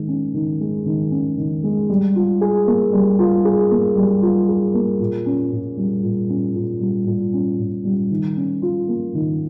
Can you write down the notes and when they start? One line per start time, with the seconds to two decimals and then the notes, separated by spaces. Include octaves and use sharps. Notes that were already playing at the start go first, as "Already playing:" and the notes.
Already playing: D#3 G#3
0.08 C#4
0.34 D#3
0.60 G#3
0.86 D#3
1.11 C#4
1.38 D#3
1.63 G#3
1.90 G3
2.16 F4
2.41 G#4
2.67 A#3
2.93 G3
3.19 F4
3.45 G#4
3.71 A#3
3.96 G3
4.22 F4
4.49 G#4
4.74 A#3
5.00 A#2
5.26 C#4
5.52 A#2
5.77 G3
6.03 A#2
6.29 C#4
6.55 A#2
6.81 G3
7.07 A#2
7.33 C#4
7.58 A#2
7.85 G3
8.11 D#3
8.36 C#4
8.62 F4
8.88 A#3
9.14 D#3